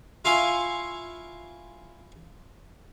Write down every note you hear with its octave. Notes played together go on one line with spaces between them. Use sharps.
E4 F4 F5 G#5 C6 C#6